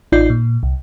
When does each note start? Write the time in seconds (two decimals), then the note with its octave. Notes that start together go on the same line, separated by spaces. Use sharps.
0.12 A1 D#4 F4 D5 G6 C7
0.30 A#2
0.63 C2